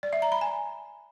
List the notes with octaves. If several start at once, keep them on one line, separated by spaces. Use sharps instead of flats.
D5
E5
A#5
B5
G#5